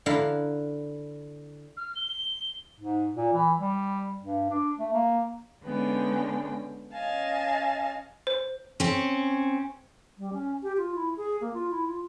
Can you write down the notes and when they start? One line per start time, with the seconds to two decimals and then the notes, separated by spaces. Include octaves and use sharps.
0.06 D3 E4 F5 F#5 A#5
1.77 F6
1.95 G7
2.81 G#2
3.15 A#2
3.34 E3
3.58 G3
4.21 G2
4.51 D4
4.78 A3
4.93 A#3
5.63 D3 G#3 B3 C#4 G5
6.93 C#4 D#5 F5 G#5 A5
8.27 C5
8.80 C4 C#4
10.18 G3
10.33 C#4
10.63 G4
10.78 F4
10.95 E4
11.17 G#4
11.41 A#3
11.54 F4
11.71 E4
11.88 F4